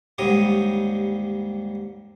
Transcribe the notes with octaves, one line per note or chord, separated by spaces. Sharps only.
D#2 G#2 D3 G3 C#5 D#6